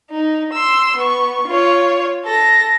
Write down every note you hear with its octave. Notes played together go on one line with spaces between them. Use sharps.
D#4
C6 E6
B3 C#6
F4 C#5
A4 A#6